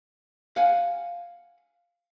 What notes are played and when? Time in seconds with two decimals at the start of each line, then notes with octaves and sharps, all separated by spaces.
0.56 F5 F#5 G#5